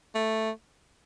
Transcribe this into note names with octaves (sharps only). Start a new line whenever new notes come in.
A3